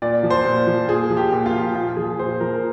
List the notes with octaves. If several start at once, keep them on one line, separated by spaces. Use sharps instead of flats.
A#2 D5
F3
C5
A#2
F3
A#2 G#4
F3
G4
A#2
F4
F3
A#2 F4
F3 G#4
A#2 C5
F3 A#4